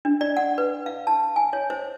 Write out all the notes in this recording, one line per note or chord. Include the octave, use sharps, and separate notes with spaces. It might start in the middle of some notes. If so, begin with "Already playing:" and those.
D4
D5
F#5
B4
F5
A5
G#5
C#5
C5